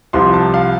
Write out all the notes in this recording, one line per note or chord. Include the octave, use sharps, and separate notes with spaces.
C2 C3 F3 C6
A5
F5